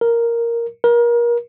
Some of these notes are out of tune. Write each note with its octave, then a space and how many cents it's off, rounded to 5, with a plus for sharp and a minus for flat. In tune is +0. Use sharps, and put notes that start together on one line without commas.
A#4 +0
A#4 +30